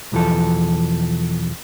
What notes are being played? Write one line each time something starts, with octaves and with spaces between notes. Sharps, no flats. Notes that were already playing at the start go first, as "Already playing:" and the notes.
B1 E2 E3 F3 A4